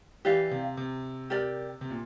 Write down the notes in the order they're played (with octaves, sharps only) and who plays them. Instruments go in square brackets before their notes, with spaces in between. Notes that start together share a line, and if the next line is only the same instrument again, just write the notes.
[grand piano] E3 [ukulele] G4 D5 F5
[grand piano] C3
C3
[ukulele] G4 A#4 D5
[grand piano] C3
A#2